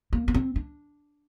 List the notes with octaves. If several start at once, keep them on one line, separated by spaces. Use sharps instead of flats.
A#3
B3
C4
D4